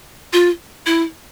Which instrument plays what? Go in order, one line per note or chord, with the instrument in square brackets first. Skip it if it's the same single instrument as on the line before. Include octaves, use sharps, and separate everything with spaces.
[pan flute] F4
E4